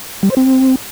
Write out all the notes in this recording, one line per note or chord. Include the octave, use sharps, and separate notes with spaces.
G3
C5
C4